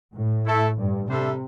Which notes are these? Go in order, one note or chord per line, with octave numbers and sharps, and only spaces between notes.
A2
A3 E4 A4
G2
C3 G3 D4 A4 C5 E5